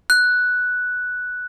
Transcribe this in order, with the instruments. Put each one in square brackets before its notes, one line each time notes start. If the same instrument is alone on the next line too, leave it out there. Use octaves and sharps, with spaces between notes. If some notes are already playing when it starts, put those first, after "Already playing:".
[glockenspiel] F#6